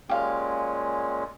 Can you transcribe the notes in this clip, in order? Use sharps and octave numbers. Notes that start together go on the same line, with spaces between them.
A#2 G#3 C#4 G4 F5